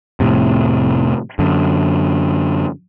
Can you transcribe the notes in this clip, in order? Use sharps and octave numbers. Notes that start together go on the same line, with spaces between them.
F1 B1 A2 C3
F#2 D3